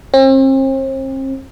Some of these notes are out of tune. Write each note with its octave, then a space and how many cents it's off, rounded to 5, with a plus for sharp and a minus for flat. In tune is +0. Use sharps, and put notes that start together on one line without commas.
C4 +40